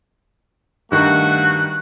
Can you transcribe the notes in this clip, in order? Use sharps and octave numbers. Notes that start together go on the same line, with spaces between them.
G2 D#3 A3 F#4 F#6